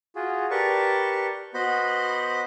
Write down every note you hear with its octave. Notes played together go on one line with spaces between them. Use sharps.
F4 F#4 G#4
G4 A#4 B4 D5 A5 C#6
B3 F#4 C5 D#5 B5 F#6